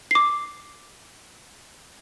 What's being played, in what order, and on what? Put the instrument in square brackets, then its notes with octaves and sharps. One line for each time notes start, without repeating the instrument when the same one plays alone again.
[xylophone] D6 C7